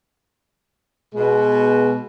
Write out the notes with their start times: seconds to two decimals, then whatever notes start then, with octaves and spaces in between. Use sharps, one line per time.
1.14 B2 G#3